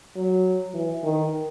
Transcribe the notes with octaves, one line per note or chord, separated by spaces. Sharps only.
F#3
E3
D#3